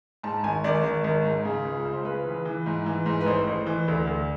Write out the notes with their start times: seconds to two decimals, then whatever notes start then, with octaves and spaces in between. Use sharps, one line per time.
0.23 G#2 A5
0.43 G#1 G#5
0.64 G#1 D5
0.83 G#1
1.04 G#1
1.25 G#2
1.45 C#3
1.65 C#2
1.85 C#2
1.93 C5
2.05 C#3 B4
2.25 E3
2.45 E3
2.66 G#2
2.86 E3
3.06 G#2
3.21 B4
3.26 A1 C5
3.47 A1
3.66 E3
3.88 D2
4.07 D2